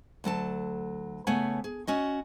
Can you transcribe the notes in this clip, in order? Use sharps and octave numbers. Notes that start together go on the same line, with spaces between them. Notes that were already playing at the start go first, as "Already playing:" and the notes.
D2 F#3 A4 A5
C#3 A3 B3 C#5 F#5 G#5
G#4
C#4 F#4 D#5